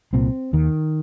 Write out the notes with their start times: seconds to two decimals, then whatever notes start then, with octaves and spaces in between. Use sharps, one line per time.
0.13 C2 A#2 C4
0.53 D#2 D#3